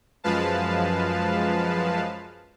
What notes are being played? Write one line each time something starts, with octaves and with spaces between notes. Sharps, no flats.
F#2 F3 G#3 B4 F5 A5